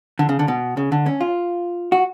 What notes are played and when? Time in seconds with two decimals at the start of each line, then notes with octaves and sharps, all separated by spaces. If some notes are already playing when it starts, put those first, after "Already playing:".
0.19 D3
0.29 C#3
0.39 D3
0.48 B2
0.77 C#3
0.92 D3
1.06 C#4
1.21 F4
1.92 F#4